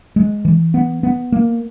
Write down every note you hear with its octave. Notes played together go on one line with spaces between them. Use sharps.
G#3
E3
B3
B3
A#3